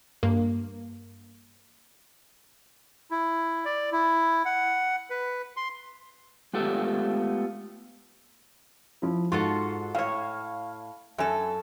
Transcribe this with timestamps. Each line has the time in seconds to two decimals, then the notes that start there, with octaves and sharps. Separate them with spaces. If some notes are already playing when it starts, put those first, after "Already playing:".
0.23 G2 A#3
3.11 E4
3.65 D5
3.92 E4
4.45 F#5
5.10 B4
5.57 C6
6.53 G#3 A3 B3 F4 G4 A4
9.02 F3 E4
9.32 G#2 F4 F#4 A4 C6
9.95 A2 C#5 F5
11.18 F#2 A4 E5 G#5